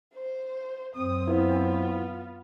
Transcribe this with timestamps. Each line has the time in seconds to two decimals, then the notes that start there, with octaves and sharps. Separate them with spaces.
0.14 C5
0.95 F#2 C4 D#6
1.28 B3 E4 F4 B4 C5